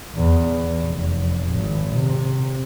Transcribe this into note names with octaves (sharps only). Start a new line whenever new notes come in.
E2
F1
G#1
C3